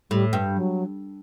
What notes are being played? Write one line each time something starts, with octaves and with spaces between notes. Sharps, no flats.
A2 G3
G2
F#3